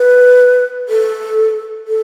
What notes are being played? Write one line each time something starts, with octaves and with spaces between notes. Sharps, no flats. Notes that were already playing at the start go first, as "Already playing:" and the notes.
Already playing: B4
A4
A4